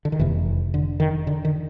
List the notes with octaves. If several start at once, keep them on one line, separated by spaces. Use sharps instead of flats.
D3
D#3
F1 E2 C3 E3
D3
D#3
D3
D#3